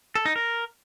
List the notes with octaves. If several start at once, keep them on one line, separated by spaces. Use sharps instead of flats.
A4
D#4
A#4